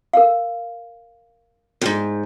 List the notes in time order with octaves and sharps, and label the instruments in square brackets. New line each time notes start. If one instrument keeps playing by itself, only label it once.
[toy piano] A#4 F5
[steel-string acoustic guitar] F2 G#2